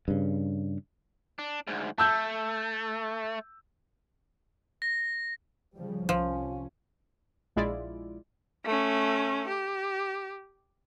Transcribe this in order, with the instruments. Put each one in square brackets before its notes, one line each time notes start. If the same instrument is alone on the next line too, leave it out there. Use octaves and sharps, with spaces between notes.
[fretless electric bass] G2 C#3
[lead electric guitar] D4
D2 G#2
[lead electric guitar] A3 [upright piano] A5 E6 G6
[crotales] A#6
[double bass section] C#3 F3 G3
[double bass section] C2 C#4 [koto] F3
[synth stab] A#1 G#3 E4 F4 D5
[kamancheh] A3 C#4
G4